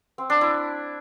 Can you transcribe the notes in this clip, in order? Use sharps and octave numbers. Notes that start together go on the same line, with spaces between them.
C4
D4
E4